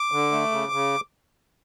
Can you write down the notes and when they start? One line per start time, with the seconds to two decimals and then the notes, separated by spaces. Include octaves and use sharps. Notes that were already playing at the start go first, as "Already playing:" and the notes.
Already playing: D6
0.12 D3
0.32 A3
0.52 C#3
0.72 C#3